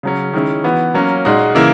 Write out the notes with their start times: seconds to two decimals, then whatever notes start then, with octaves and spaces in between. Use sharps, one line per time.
0.03 C#3 F#3 C#4
0.34 D#3 G#3 C#4 E4
0.64 E3 B3 F#4
0.94 F#3 A#3 C#4
1.25 A#2 G#3 D#4 F#4
1.55 C#3 E3 A#3 E4